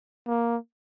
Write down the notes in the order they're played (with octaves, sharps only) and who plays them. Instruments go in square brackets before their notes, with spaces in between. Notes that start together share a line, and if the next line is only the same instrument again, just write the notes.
[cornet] A#3